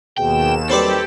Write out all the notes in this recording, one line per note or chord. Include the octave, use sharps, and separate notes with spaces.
D#2 B2 G#4 G5 E7
D#3 F#3 G3 C4 G4 A4 B4 D5